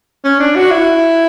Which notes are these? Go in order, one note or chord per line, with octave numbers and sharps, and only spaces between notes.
C#4
D4
F#4
E4